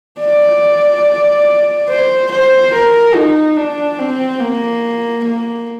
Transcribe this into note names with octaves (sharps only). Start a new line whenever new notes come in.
D5
C5
C5
A#4
D#4
D4
C4
A#3
A#3